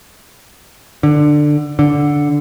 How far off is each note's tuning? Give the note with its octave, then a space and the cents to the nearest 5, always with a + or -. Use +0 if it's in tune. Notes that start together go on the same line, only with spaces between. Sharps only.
D3 +15
D3 -5